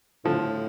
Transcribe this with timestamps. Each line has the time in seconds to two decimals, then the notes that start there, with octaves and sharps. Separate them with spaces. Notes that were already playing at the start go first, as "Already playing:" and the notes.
0.25 A2 D3 F3